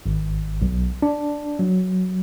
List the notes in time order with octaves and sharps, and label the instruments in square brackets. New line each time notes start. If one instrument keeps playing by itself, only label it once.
[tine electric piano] G#1
B1
D4
F#3